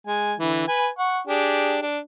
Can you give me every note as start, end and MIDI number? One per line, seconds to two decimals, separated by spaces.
0.07 0.34 56
0.07 0.34 80
0.39 0.65 50
0.39 0.65 52
0.68 0.89 71
0.68 0.89 80
0.99 1.20 78
0.99 1.20 85
1.27 1.81 62
1.27 1.81 67
1.27 1.81 68
1.82 1.98 62